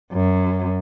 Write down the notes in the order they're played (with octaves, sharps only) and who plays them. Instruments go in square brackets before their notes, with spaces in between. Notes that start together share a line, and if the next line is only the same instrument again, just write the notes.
[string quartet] F#2